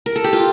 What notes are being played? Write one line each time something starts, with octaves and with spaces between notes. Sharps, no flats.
A#4
A4
G4
F4